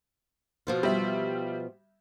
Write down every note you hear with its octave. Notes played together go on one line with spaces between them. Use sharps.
B2 F3 F4
G3 E5